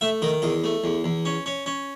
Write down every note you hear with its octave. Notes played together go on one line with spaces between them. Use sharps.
A3 E5
D#3 D#5
E2 D#5
A3
E2
E2
C#4
C#4
C#4